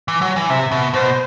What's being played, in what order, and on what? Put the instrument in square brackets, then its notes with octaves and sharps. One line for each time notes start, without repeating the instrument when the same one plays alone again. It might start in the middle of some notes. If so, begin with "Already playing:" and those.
[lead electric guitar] E3
F#3
E3
[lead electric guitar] C3 [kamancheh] E5
[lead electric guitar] B2
[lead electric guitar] B2 [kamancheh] C5